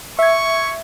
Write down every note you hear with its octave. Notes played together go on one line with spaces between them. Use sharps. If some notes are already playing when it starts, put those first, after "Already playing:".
E5 C#6 G#6